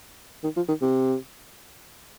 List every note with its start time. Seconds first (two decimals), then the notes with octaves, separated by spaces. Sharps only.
0.44 D#3
0.56 F3
0.68 D#3
0.81 C3